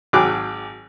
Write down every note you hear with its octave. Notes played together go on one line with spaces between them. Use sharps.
G#1 F#3 G#4 G5 D6 F#6